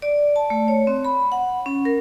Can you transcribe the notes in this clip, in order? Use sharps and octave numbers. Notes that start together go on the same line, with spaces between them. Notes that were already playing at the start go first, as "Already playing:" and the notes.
D5
A5
A3
C#5
C4
B5
F#5
C#4
A#4